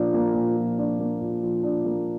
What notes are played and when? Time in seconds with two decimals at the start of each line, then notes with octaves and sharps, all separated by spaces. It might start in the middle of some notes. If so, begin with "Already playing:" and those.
Already playing: A#2 F3 A#3 D4
0.14 A#3
0.34 A#2
0.57 F3
0.78 D4
1.00 A#3
1.21 A#2
1.43 F3
1.63 D4
1.85 A#3